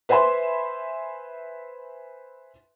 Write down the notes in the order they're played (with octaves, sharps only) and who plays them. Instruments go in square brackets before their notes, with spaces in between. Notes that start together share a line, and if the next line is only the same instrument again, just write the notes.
[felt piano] B4 C5 E5 G#5 B5 C6